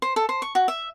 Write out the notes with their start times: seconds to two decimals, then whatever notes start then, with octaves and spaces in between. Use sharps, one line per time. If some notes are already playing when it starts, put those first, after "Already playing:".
0.02 C5
0.16 A4
0.29 C5
0.42 C#6
0.55 F#4
0.68 E5